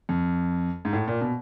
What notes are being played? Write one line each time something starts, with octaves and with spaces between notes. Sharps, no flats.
F2
G#2
A2
A#2
B2